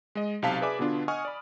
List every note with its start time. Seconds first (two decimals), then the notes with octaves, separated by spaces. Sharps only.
0.15 G#3 D#5
0.42 B1 C3 F5 A5 B6
0.61 G#4 B4 D5 E5 G#5 D6
0.79 B2 D3 B3 D4 F4
1.08 D#5 F#5 G#5 C#6 D#6 F6
1.25 D5 B5